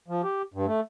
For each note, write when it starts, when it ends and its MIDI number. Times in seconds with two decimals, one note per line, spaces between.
0.08 0.22 53
0.23 0.42 67
0.54 0.66 43
0.67 0.80 57